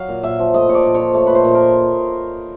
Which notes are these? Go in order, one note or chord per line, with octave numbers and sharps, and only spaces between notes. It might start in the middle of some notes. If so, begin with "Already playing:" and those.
Already playing: F#3 F5
A#2
A#2 E5
F3
A3 D#5
A#2 C#5
D5
A#2
C#5
F3
A3 C#5
A#2 B4
C5
A#2
A#4